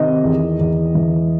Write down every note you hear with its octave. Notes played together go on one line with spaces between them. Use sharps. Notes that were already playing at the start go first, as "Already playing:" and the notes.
Already playing: C3 D#3 D#5
E2
E2
E3